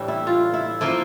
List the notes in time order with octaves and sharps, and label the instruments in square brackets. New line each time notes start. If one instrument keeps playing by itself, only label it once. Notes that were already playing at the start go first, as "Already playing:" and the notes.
Already playing: [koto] A2 E3 G3 [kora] D4
[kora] E4
F4
E4
[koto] F3 A#3 F4 [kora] E4